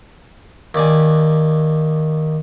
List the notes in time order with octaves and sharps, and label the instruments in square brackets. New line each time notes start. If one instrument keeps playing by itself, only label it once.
[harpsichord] D#2 D5 G#5